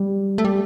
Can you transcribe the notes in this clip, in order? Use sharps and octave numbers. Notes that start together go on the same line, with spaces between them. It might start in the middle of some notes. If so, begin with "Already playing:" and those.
Already playing: G3
A3
G3